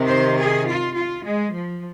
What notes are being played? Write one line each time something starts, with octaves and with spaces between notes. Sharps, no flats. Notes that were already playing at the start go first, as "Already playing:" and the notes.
Already playing: C3 D#3
C5
G#4
F4
F4
G#3
F3